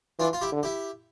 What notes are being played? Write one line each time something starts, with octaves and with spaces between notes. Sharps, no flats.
E3 D4 F4
F4
E4 G4
D3
E4 G4